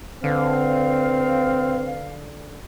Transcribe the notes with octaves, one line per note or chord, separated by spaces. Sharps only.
D3 C4 B4 F5